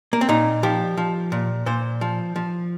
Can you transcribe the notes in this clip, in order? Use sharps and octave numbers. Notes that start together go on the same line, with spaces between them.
A#3
C4
A#2 D#4
F3 G4
F3
A#2
A#2 C5
F3
F3